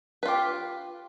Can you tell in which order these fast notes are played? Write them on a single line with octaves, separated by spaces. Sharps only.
B4 F4 G4